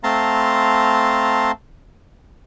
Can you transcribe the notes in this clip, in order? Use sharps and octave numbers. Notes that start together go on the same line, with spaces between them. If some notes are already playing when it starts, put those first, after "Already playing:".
A3 C4 F5 A5 A#5 C6